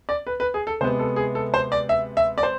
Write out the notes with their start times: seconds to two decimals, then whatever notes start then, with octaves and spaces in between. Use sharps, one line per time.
0.09 D5
0.27 B4
0.40 B4
0.54 G#4
0.67 A4
0.81 C3 G#3 B3 C5
0.99 A4
1.16 G#4
1.35 A4
1.54 C5
1.72 D5
1.89 E5
2.17 E5
2.38 D5
2.43 C5